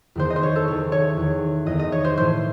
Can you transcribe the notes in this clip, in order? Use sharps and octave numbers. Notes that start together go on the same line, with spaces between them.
E2 D#3 C5
D#5
C5
C#5
A4
E2 D#3 C#5
C#5
E2 D#3
E2 D#3 D#5
D#5
C#5
C5
A2 E3 C5